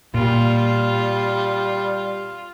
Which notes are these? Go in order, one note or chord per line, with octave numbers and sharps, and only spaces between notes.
A#2 G3 F4